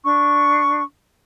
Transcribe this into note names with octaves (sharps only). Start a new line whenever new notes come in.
D4 C#6